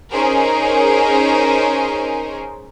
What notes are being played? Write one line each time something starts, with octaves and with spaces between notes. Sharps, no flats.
C#4 D#4 G#4 A#4 C5